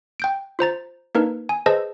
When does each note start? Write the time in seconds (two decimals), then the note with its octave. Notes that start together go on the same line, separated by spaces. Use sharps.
0.20 G5 G6 D7
0.59 F4 C5 A#5 A6
1.15 A#3 D4 D#4 A#4 B4
1.49 G#5
1.66 G#4 B4 C5 D#5 A5 E6